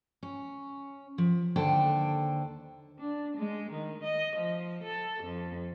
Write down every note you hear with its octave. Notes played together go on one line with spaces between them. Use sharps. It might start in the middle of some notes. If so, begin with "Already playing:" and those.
C#4
F3
D#2 D3 C5 G5 A5
D4
G#3
D#3
D#5
F3
A4
F2